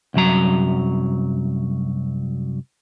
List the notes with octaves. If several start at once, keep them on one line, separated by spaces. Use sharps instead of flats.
C2 F#2 F#3 A#5